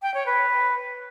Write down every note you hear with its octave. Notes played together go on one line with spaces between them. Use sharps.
G5
C#5
B4